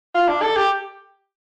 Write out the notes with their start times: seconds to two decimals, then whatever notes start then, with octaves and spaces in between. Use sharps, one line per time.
0.15 F4
0.28 D4
0.42 A4
0.56 G4